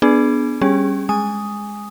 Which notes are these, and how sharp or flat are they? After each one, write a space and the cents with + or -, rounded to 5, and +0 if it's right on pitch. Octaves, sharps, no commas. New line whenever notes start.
B3 +0 D4 +0 G#4 +15
G3 +0 C#4 -15 G#4 -10
G#3 -5 G#5 -5 D#6 +0